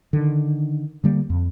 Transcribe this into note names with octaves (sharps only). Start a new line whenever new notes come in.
D3 D#3
D3 G3 A#3
F2